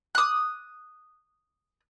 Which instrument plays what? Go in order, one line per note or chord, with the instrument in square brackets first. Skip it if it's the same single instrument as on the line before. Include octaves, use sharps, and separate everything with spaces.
[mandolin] D#6 F#6